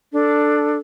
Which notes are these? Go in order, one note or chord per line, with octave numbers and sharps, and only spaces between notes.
D4 A4